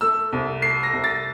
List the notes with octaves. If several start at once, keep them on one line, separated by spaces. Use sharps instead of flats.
A3 E6
C2
A3 C7
A#6
C2
A6